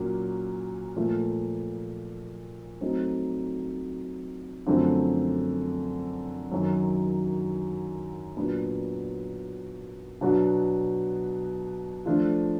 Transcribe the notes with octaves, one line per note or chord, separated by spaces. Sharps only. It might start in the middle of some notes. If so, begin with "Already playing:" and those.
Already playing: A#2 F#3 A#3 C#4
A#2 F3 A3
F#3 A3 C4 D#4
F#2 D3 F3 A3 C4
F#2 D#3 F#3
A#2 F#3 B3 D4
B2 F#3 B3 D4 F#4
F3 A3 D4 F4